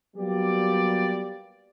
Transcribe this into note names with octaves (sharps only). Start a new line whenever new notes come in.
F#3 G3 A#3 B3 G4 D5